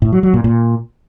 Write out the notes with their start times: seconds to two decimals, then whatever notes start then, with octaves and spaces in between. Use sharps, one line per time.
0.02 A2
0.12 F#3
0.23 F#3
0.34 A#2
0.44 A#2